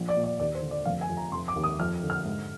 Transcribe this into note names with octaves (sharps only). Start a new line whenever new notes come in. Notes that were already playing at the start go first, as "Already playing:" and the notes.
Already playing: A#1
D5
A#2
D5
D#2 D5
C5
D3
D5
F1 F5
G#5
F2
A#5
F1 C6
D6
D#2
D#6
F2 F6
D3
F6
G#2